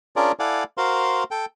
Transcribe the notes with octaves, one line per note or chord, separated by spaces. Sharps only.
C#4 D4 F4 G#4 A#4 D5
E4 A4 D5 F5 F#5 G#5
F#4 A#4 C5 F5 C6
A4 G5